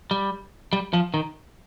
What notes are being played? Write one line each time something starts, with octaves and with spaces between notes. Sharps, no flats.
G3
G3
F3
D#3